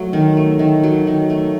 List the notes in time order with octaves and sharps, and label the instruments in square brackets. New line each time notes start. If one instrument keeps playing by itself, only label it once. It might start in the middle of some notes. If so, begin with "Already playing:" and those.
Already playing: [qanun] F#3 A3
D#3
A3
D#3
F#3
D#3
A3